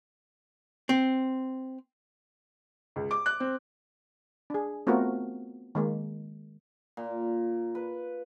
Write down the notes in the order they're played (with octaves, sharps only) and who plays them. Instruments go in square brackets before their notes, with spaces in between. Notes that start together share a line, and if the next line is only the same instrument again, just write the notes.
[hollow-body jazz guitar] C4
[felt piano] C#2
D6
F#6
C4
[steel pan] D4 G#4
A3 B3 C4 F4 F#4 A#4
D#3 G#3 A#3
[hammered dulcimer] A#2
B4